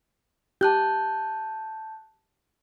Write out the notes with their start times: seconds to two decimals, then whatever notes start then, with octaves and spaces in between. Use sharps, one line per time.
0.61 G4 A5 F#6 G6